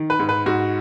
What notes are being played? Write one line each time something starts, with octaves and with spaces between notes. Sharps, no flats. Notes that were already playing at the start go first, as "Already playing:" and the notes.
Already playing: D#3
B4
G#2
B4
G#2 F#4